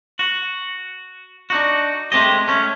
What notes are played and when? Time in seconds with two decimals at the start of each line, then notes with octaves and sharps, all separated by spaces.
0.19 F#4
1.50 D4 D#4 F#4
2.12 G#3 A3 C4 G4 D#5
2.48 A3 C#4